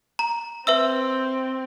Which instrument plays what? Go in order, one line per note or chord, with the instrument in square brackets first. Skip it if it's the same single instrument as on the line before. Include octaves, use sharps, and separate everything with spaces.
[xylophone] A#5
[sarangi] C4 [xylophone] B4 E5 E6